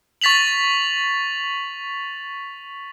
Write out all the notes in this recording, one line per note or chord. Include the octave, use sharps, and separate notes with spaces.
C#6 A6 B6 F7 F#7